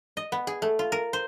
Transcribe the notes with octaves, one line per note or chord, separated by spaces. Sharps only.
D#5
B3
G#4
A3
F4
A#4
C5